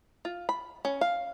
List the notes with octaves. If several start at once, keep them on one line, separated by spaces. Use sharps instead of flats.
F4
B5
C#4
F5